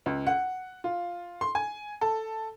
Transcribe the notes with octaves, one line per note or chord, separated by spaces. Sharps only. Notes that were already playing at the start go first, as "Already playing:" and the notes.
C#2
F#5
F4
C6
G#5
A4